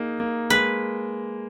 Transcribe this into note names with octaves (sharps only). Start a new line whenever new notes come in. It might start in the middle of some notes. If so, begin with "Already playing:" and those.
Already playing: A#3 D#4 G#4
A#3
G#3 B4